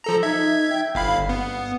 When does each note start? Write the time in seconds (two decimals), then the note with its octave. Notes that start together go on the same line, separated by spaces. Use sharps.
0.04 F3 A4 A#5
0.23 D#4 E5 G#6
0.71 G5
0.95 G1 G2 F5 B5
1.29 B3